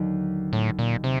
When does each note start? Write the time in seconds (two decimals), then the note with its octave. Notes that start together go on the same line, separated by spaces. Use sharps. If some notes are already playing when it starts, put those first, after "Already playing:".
Already playing: D#2 D3 F#3
0.53 A2
0.79 A#2
1.04 C3